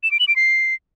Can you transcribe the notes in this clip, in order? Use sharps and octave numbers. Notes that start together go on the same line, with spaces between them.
E7
D7
F#7
D7
C7